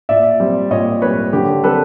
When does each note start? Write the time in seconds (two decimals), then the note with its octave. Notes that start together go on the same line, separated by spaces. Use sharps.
0.09 A#2 D5 E5
0.40 G3 C4
0.71 A#2 C#5 D#5
1.01 G3 C4 B4 C#5
1.33 D3 G4
1.63 G3 C4 A4 B4